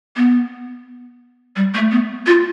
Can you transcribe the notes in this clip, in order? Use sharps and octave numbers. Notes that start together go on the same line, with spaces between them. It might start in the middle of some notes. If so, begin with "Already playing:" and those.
B3
G3
A3
B3
F4